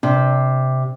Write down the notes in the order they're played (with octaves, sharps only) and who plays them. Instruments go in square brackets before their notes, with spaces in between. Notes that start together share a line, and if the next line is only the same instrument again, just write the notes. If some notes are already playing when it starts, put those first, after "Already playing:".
[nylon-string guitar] C3 [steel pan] D4